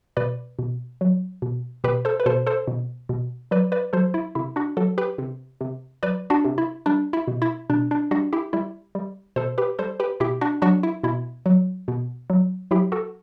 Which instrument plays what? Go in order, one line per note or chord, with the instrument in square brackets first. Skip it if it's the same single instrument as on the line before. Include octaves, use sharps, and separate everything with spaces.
[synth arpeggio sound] B2 B4 D5
B2
F#3
B2
B2 G4 B4
A4 C5
B4
B2 A4 C5
A4 C5
B2
B2
F#3 B4 D5
B4 D5
F#3 A4 C5
E4
C3 E4
D4 F#4
F#3 F#4 A4
G4 B4
C3
C3
F#3 B4 D5
D4 F#4
C3
E4
G3 D4
E4
B2
E4
B2 D4
D4
G3 D4 F#4
E4 G4
G3 E4
G3
B2 A4 C5
G4 B4
G3 A4 C5
G4 B4
B2 E4 G4
D4 F#4
F#3 D4 F#4
E4
B2 E4
F#3
B2
F#3
F#3 E4 G4
F#4 A4